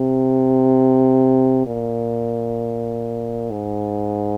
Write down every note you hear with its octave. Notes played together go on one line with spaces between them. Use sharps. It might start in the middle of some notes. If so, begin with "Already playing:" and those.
Already playing: C3
A#2
G#2